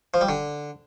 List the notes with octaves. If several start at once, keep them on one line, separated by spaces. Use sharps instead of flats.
F3
G3
D3